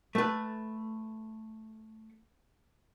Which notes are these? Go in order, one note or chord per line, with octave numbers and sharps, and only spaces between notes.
A3 B4